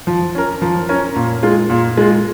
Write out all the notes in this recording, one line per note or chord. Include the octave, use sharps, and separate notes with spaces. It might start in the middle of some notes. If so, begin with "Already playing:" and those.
F3
C#4 A#4
F3
C#4 A#4
A#2
G#3 F4
A#2
G#3 F4